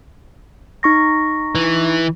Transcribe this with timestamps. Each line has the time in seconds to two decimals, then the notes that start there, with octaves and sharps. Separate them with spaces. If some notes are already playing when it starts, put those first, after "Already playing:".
0.83 D#4 C#6 A#6
1.55 E3